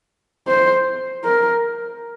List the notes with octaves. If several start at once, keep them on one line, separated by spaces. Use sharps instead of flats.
C5
A#4